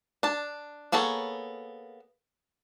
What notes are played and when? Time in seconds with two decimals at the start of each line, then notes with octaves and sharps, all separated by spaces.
0.23 D4 A5
0.92 A#3 B3 G#4 A4 C#5